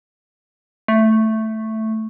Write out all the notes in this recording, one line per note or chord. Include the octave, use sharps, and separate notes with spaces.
A3